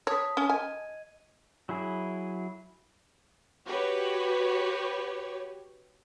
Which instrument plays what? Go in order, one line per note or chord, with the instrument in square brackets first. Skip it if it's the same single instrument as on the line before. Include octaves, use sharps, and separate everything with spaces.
[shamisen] C#5 [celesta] A5 D#6 B6
[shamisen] C#4
[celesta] D#5 G#6 D#7 [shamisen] G#5
[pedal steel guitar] F#3 E4 G#4
[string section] F#4 G4 B4 C#5